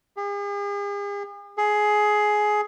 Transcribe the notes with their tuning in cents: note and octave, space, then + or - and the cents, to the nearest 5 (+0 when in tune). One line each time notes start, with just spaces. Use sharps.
G#4 -45
G#4 +15